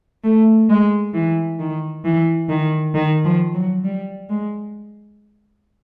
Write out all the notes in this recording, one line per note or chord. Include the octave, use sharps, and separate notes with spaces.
A3
G#3
E3
D#3
E3
D#3
D#3
F3
F#3
G3
G#3